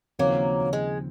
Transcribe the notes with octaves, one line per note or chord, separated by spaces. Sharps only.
D#2 C#3 F3 F#3 A#3 C4 D#4
G#3